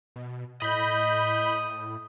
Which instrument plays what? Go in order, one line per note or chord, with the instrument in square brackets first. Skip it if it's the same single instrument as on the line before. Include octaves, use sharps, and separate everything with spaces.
[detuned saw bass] B2
[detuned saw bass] A2 [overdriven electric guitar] D#5 [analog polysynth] B5 G6 [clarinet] D#6